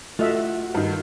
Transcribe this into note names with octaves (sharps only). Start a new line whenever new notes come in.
A3 F4 F#4 D#5 E5
G2 D#3